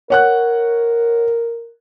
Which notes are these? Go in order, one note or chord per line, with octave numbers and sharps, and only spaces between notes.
A#4 C#5 F#5 F#6